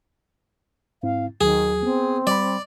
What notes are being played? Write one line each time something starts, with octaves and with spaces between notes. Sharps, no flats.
G#2 C4 E4 F5
D#2 D#3 F#3 G#4
B3 C4
G3 D5 B5